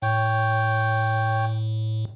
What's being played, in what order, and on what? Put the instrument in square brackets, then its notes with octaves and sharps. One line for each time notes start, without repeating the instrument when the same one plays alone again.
[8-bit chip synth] A2 [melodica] C#5 G5